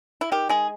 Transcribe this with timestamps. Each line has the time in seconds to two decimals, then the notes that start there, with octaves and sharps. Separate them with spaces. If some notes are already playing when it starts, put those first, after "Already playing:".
0.21 E4
0.32 D#3 G4
0.49 G#3 G#4